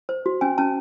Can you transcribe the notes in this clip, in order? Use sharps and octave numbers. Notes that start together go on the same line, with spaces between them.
C5
F#4
C#4 G#5
C#4 A5